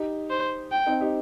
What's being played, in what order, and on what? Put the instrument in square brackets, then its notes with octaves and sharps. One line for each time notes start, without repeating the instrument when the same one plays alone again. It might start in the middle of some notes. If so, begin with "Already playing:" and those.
Already playing: [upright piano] D#4 G4
[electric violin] C5
G5
[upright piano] C4 D#4
D#4 G4